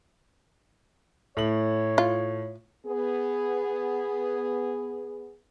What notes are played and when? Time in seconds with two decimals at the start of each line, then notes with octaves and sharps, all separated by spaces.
1.37 A2 C#5 F#7
1.98 F4
2.86 B3 G#4